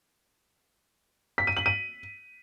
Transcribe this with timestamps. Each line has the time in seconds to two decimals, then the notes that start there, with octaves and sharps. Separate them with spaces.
1.38 B6
1.47 D#7
1.57 F#7
1.66 D#7